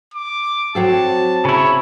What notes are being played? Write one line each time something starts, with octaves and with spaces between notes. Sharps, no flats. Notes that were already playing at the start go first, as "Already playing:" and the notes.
D6
F#3 C4 A4 A5
C#3 E4 C#5